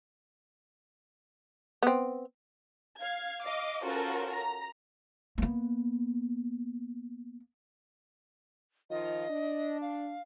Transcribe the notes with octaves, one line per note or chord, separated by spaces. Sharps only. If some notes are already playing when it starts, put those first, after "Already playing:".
B3 C4
F5 G#6
D#5 F5 D6
C#4 F4 F#4 A4 A#4 C5
A#5
A#3 B3
D#3 F3 F4 D#5
D4
F5